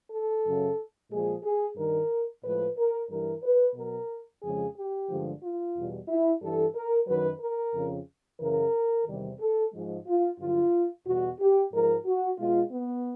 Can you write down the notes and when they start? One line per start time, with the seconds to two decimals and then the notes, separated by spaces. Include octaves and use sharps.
0.11 A4
0.44 F#2 C#3 F#3
1.11 A#2 F3 G#3 G#4
1.43 G#4
1.77 G2 D#3 G3 A#4
2.44 A2 F3 G#3 B4
2.77 A#4
3.10 G2 E3 G3 A#4
3.43 B4
3.76 B2 F#3 A#4
4.42 F2 C#3 F3 G#3 G#4
4.76 G4
5.09 G2 D3 F3 G#3
5.42 F4
5.75 E2 B2 G3
6.08 E4
6.42 G2 E3 G3 A4
6.75 A#4
7.08 F#2 D#3 F#3 B4
7.40 A#4
7.74 F2 C#3 F3
8.40 F#2 C#3 E3 A#4
9.07 E2 C3 D#3 G3
9.41 A4
9.73 G#2 F3 G#3
10.06 F4
10.39 G2 D3 F#3 F4
11.06 E2 B2 G3 F#4
11.40 G4
11.72 G#2 F3 G#3 A#4
12.06 F#4
12.38 B2 G#3 F4
12.71 B3